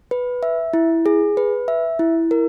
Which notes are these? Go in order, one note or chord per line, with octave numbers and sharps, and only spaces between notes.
B4
E5
E4
G#4
B4
E5
E4
A#4